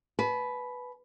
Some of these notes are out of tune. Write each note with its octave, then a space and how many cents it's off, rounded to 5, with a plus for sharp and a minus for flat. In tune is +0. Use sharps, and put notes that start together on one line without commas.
B4 +0 A5 -45